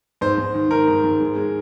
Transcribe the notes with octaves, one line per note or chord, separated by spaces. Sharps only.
G#2 C5
G#2
D#3
D#3 A#4
G#2
G#2
G#3
G#3